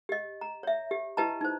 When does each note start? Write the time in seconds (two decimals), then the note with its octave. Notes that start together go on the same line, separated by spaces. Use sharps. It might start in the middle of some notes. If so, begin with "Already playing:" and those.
0.09 G4 D#5
0.41 A#5
0.63 C#5 E5
0.91 G4
1.17 E4 G4 B4 D#5 A5 A#5
1.41 D#4 C5